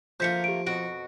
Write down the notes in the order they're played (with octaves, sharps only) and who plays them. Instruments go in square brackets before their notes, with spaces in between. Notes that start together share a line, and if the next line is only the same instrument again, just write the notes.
[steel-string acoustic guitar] D2 A3 A#3 [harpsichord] F3 [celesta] G6 B6 C#7
[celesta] G4 D7
[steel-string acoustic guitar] F2 B2 F#4 [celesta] D7